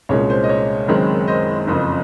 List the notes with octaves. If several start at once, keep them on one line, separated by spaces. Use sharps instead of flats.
C2 A#2 G#3 C#4 C#5
C5
D#5
C#5
F#1 F#2 D#3 G#3 C4
C5 D#5
F#1 F2 C#3